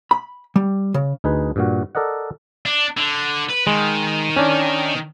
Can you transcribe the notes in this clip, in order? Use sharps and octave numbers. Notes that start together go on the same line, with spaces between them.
B5
G3
C#3
D2 D#4 G#4 B4
G2 A#2 F#4
A4 A#4 D5 D#5 F#5
D4
D3
B4
D#3 G#3
C#4 D4